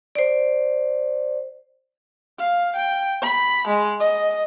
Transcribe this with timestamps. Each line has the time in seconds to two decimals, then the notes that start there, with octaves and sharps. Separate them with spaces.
0.15 C5 D5
2.39 F5
2.76 G5
3.22 B5
3.68 G#3
4.00 D#5